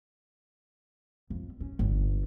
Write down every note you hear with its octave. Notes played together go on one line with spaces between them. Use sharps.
F2
C#4
G1